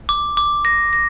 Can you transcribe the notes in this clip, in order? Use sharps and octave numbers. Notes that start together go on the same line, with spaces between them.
D6
D6
A#6
A#6